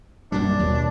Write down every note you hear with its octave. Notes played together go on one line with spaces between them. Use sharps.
F#2 A#2 G3 D4
D#2 B2